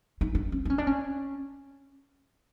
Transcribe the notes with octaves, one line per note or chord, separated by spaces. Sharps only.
D#4
D4
C#4
D4
C#4
D4
C#4